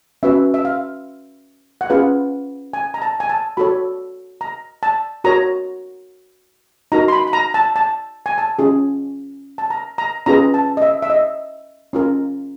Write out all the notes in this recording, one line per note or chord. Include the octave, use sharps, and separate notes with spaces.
C#4 F#4 B4 E5
E5
F5
F#5
C#4 F4 G#4 B4 F5
G#5
A#5
A5
G#5
A5
F#4 A4 C#5 B5
A#5
A5
F#4 A#4 C#5 A#5
D#4 F#4 A#4 A#5
C6
B5
B5
A#5
A5
A5
G#5
A5
C#4 F4 G#4
A5
A#5
A#5
C#4 F4 G#4 B4 A#5
A5
D#5
E5
E5
D#5
C#4 F4 A#4